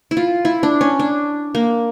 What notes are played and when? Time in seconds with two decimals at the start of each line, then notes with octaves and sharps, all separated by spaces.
0.11 E4
0.17 F4
0.45 E4
0.63 D4
0.81 C#4
0.99 D4
1.55 A#3